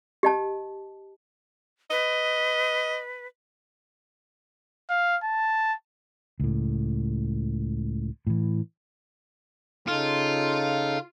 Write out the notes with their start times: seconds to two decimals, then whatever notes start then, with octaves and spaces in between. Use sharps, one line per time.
0.23 G4 D#5 A5
1.91 B4 D#5
4.90 F5
5.24 A5
6.40 C#2 A2
8.27 A2 E3
9.88 C#3 D#4 F4 A4